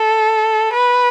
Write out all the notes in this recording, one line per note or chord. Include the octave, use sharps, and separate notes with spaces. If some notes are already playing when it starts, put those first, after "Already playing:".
Already playing: A4
B4